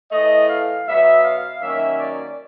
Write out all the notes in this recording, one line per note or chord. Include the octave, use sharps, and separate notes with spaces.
A2 E3 A3 D#5
F5
B2 F#3 B3 E5
F5
D#3 F#3 A#3 C#4 E5
D5